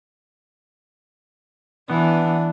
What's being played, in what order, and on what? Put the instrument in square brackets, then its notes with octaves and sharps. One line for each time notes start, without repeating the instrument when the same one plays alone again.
[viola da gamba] E3 [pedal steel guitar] B3 [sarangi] D4